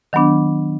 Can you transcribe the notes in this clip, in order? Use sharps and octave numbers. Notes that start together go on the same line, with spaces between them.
D#3 F#3 B3 D4